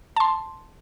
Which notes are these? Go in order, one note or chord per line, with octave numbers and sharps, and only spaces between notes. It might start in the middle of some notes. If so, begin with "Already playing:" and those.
A5 C6